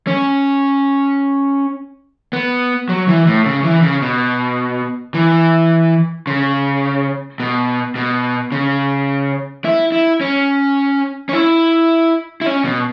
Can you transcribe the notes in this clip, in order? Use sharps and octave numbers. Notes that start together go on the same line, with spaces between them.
C#4
B3
F#3
E3
A2
C#3
E3
C#3
B2
E3
C#3
B2
B2
C#3
E4
E4
C#4
C#4
E4
E4
C#4
B2